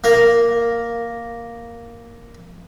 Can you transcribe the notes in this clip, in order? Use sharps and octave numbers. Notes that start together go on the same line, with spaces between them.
A#3 A#4